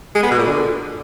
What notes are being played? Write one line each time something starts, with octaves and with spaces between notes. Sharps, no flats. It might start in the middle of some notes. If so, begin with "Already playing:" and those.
G#3
B3
B2
A#2
D3